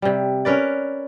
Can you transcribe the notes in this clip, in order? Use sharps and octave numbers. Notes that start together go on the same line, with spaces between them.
C3 G3
C#4 A#4 B4 D5